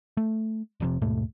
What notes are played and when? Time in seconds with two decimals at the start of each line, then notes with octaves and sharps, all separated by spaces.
0.17 A3
0.80 F1 F2 C3
1.02 D#2 G#2 B2 A3